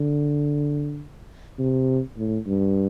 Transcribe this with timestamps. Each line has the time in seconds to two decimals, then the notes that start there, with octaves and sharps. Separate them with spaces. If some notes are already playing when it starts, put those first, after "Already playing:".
Already playing: D3
1.59 C3
2.17 A2
2.46 G2